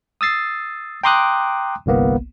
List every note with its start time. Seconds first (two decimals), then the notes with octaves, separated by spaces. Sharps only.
0.21 D#6 E6 A6 C7
1.04 G5 A#5 C6 D6 D#6 F#6
1.86 G1 C2 A#3 B3